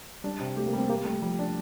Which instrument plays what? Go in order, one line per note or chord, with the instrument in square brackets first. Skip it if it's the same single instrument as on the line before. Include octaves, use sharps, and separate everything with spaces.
[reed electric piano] G3 [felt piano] D4
[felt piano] C3
[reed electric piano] A3 [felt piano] G4
[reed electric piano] A#3
[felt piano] G3
[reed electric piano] C4
[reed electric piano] A#3 [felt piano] G4
[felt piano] G3 [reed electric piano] A3
[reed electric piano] F3 [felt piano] G3
[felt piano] D4